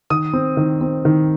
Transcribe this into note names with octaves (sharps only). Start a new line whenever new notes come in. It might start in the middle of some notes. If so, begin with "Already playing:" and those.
D#3 D#6
C4
D#3
C4
D#3